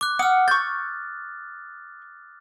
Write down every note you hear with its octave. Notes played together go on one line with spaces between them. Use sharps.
D6 F#6
F#5 D#6 F6
C#6 G6 A6